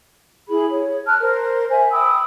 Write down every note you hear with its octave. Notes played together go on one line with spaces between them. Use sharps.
E4 G#4 B5
C#5
A5 F6 F#6
A#4 C5
E5 G#5
G5 B5 D#6 E6